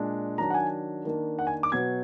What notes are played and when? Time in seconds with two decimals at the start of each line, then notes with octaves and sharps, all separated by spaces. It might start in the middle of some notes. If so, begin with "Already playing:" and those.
Already playing: A#2 G#3 D4
0.38 D#3 F#3 D4 A#5
0.50 F#5
0.54 G#5
1.05 D#3 A#3 D4
1.39 F#5
1.47 G#5
1.63 D6
1.72 B2 F#3 B3 G#6